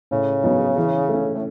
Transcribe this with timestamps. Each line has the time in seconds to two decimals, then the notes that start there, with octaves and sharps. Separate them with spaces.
0.11 A2 C#3
0.44 F#3 B3 D#4
0.77 E3
1.09 A3 C#4
1.35 A2